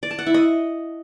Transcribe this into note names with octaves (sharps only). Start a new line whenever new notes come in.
D5
A5
F#5
E4
D#5